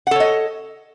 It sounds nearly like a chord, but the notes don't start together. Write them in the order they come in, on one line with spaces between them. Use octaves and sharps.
F#5 A4 C#5 D#5